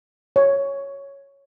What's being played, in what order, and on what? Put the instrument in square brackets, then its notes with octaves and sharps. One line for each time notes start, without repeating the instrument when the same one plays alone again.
[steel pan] C#5